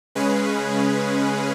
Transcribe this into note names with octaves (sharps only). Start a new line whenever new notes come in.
C#3 G#3 C#4 G#4 B4